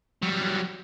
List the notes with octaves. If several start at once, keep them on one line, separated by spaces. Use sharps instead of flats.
F#3 G3